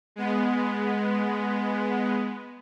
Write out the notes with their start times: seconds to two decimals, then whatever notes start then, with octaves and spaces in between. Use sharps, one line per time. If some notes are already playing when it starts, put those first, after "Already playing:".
0.16 G#3 B3